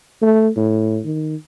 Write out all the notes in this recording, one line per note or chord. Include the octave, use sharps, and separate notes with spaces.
A3
A2
D#3